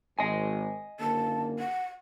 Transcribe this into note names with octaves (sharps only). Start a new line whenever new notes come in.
G#1 D#5 G#5
F#1 D3 A#3 A5
F#5